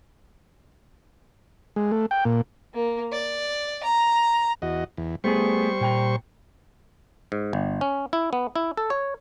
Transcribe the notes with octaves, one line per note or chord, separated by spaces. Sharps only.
G#3
A3
G5
A#2
A#3
D5
A#5
E2 F#4 D#5
E2
G3 A3 B3 G#4 C5 C#6
A#2 G5 A#5
G#2
G1
C#4
E4
B3
E4
A4
C#5